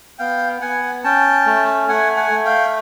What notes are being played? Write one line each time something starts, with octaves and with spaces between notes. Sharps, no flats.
B3 F5 G5
B3 F#5 G#5
C#4 G5 A5
A3
A3 F#5 G#5
F#5 G#5
A3
F5 G5